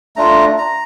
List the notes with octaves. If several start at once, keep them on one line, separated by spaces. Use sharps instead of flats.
A3 D4 F4 A#5
A#5